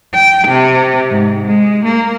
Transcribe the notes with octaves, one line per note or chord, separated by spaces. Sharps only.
G5
C3
G#2
G#3
A#3